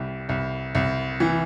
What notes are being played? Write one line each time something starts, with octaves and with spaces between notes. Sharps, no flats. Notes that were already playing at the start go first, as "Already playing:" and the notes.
Already playing: C2 G3
C2
C2
E3